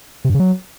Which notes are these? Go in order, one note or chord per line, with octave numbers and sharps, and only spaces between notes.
C3
G2
C#3
F#3